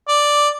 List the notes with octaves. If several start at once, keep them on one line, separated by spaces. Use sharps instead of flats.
D5